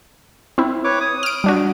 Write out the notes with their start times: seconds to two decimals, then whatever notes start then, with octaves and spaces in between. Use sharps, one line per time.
0.58 C4 E4
0.84 B4 C#5 D6
1.01 D#6
1.23 F6 D7
1.44 G3 D4 F#4